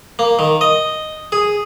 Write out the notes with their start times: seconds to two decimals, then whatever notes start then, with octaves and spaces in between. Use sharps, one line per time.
0.19 A#3
0.39 D#3
0.61 D#5
1.32 G#4